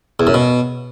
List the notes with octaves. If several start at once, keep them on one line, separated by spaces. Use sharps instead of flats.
E2
F#2
B2